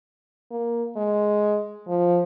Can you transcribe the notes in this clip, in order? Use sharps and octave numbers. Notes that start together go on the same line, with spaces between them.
A#3
G#3
F3